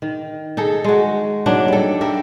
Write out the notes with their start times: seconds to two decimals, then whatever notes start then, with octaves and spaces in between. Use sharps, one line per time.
0.02 D#3
0.57 D#4 G#4 A4
0.84 G#3 F#4
1.46 F#3 A#3 D4 D#4
1.68 G3 A4
2.01 G4 A#4 E5